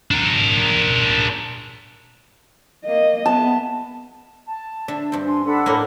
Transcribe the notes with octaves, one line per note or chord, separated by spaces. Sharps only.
D4 A#4
A#3 D#5
B3 A5
A5
D3 D4 E5
G2 C4
D4 G#5 C6
D4 A4 F#5 B5
A2 A#3